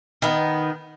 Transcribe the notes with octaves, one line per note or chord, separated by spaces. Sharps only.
D#3 B3